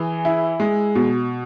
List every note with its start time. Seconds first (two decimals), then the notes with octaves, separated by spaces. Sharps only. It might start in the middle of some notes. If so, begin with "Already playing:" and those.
Already playing: E3 G#4
0.25 E4
0.60 G#3
0.95 B2